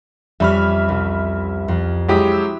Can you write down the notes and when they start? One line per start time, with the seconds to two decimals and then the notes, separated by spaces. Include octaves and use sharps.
0.40 F2 G3 C#4 E5 B5 F6
0.89 C2
1.68 F2
2.08 F#3 G#3 E4 G4 D#6 B6
2.32 E6